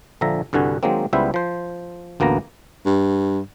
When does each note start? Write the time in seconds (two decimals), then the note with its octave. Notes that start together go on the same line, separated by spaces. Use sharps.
0.21 A#1 D3 F3 E5 A#5
0.53 C2 G2 D3 F#4 G#5
0.83 D#3 F#3 G#3 A#3 C4
1.13 C#2 G3 B3 E4 C5 E5
1.34 F3 C5
2.20 A1 D2 A#3 B3 A#5
2.86 G2